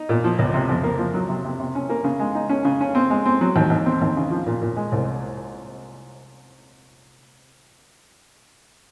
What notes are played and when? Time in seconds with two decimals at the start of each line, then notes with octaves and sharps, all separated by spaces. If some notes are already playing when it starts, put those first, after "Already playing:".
Already playing: D#4
0.09 A#2
0.24 F3
0.39 C#2
0.54 C3
0.69 F2
0.83 A#3
0.99 F3
1.14 F#3
1.29 C3
1.45 C3
1.60 C3
1.75 C#4
1.90 A#3
2.04 C#3
2.19 G#3
2.35 D#4
2.49 C#4
2.65 C#3
2.81 C#4
2.95 C4
3.10 G#3
3.26 C4
3.41 F#3
3.56 D#2
3.70 D#2
3.86 C4
4.01 D#2
4.17 C#3
4.31 F3
4.46 A#2
4.61 A#2
4.77 G#3
4.92 C2